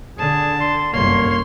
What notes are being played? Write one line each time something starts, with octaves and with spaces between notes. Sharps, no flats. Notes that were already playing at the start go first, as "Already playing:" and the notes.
D3 G#4 A5
C6
G1 C2 F#2 A#3 C#5 C6